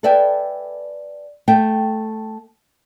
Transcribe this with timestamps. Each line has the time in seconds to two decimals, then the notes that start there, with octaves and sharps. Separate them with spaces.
0.03 A4 B4 D5 E5 G5 G#5
1.48 A3 E5 G5